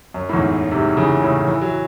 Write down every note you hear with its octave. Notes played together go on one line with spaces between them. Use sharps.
F#2
A2
E2 G#2
G#2 C3
C#3 E3
A2 C#3
E3
F#3